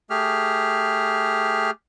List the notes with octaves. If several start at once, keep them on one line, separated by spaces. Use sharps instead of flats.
A3 G4 G#4 F6